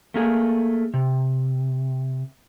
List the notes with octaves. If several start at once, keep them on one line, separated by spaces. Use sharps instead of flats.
A3 A#3 G#4
C3